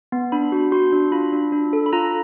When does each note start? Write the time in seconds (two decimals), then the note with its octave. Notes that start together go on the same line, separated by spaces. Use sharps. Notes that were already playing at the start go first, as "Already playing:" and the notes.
0.12 B3
0.32 D4 B5
0.52 F#4
0.72 F#4 C6
0.93 D4
1.12 F4 B5
1.32 D4
1.52 D4
1.73 A4
1.86 B5
1.93 F4 A#5